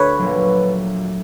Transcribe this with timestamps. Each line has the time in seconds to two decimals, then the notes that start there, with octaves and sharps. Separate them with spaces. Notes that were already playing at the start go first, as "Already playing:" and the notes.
Already playing: D2 B4 C#5
0.18 A#1 A#2 F#3